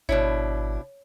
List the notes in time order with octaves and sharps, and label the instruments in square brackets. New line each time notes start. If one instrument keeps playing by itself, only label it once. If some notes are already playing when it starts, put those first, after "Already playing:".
[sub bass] G#1 [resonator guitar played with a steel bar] B2 D4 E4 [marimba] C#5